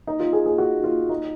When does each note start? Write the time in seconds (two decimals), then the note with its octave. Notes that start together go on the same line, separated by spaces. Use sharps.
0.07 D#4
0.20 F4
0.33 G#4
0.46 G#4
0.58 F#4
0.84 F4
1.09 D#4